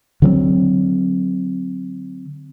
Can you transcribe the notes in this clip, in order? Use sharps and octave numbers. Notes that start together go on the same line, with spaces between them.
D3 F#3 B3 C4